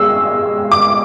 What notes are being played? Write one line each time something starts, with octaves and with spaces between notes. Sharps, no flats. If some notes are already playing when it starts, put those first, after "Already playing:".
Already playing: G#3 E6
D6